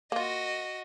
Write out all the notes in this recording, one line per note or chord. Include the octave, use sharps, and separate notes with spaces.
A#3 F4 F#4 D#5